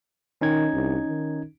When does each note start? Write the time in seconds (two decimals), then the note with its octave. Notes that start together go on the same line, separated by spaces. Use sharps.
0.41 D#3 C#4 D#4 G#6
0.74 C2
1.08 D#3